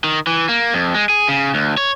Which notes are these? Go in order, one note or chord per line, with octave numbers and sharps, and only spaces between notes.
D#3
E3
A#3
F2
G#3
G#4
C#3
D2
C#5